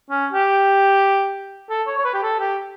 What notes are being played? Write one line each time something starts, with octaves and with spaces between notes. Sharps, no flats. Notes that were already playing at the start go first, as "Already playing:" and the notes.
C#4
G4
A4
C#5
C#5
B4
G4
A4
G4